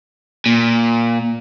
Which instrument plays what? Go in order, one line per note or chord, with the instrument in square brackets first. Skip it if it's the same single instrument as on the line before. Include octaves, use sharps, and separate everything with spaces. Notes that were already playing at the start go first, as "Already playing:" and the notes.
[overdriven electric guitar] A#2